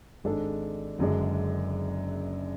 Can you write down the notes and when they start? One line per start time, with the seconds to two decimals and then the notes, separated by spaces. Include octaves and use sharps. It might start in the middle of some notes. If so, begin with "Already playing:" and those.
0.24 G#1 G#2 G#3 D4 A4
0.99 F#1 F#2 D3 G#3 D4